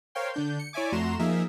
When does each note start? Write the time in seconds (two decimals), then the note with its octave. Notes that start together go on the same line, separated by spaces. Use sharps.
0.15 A#4 C5 C#5 F5 G5 C6
0.34 D3 D4 G6
0.59 C#7
0.73 E4 C#5 D5 E5 G#5 D6
0.92 F2 A3 F#4 A#5 C6 E7
1.19 F3 A#3 D#4 G#4 A#4 E5